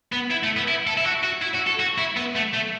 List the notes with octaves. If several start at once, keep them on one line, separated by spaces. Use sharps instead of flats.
B3
E4
A3
B3
E4
A4
E4
F#4
F#4
E4
F#4
A4
F#4
E4
B3
A3
A3